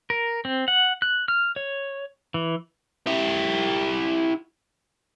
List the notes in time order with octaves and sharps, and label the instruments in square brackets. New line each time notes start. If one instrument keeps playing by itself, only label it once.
[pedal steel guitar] A#4
C4
F#5
F#6
F6
C#5
E3
[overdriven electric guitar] E4 G4